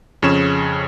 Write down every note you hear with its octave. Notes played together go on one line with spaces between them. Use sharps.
F2 C#3 C#4 C#5 E7